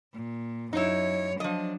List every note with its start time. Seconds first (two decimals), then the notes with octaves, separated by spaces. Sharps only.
0.14 A#2
0.73 F#2 D#4 E4 C#5
1.40 F3 F#3 D4 D#5